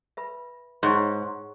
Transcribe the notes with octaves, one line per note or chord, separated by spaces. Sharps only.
B4 E5 B5
G#2 G#4 C#5 F#5 A#5 C#6